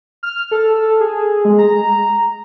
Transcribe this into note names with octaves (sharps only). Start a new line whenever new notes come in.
F6
A4
G#4
G#3
A#5